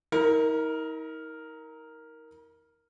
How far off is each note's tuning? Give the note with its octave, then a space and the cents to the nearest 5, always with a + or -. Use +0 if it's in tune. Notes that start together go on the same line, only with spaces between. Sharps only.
D#4 +45 A#4 +0